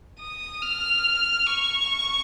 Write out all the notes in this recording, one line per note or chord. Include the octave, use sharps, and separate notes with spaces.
D#6
F6
C#6